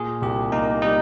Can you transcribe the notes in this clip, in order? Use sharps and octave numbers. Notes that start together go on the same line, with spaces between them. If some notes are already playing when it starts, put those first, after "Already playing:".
Already playing: A#2 G#4
C2 G4
A#3 D#4
G3 D#4